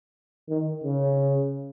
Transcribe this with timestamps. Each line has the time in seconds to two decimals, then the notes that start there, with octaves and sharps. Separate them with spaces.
0.49 D#3
0.84 C#3